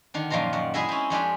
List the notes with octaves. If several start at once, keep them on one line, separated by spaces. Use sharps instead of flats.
D3 D#3 D4
F#2 A#2 D#3 F3 A#5 C6
F#2 F#5
G#3 E4 G#4 D#5 E5
C4 C#4
F2 G#3 D4 G4